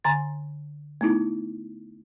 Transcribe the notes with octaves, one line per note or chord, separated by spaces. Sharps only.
D3 G#5 A#5 C6 A6
A3 B3 D#4 E4